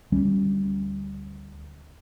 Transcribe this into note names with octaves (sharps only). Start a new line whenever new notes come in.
D2 G3 C#4